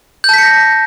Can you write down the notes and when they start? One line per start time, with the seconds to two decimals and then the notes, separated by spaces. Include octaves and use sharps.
0.24 G6
0.29 A5
0.34 B6
0.38 C#7
0.43 A#6